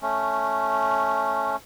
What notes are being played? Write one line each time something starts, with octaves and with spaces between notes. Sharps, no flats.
A3 C#4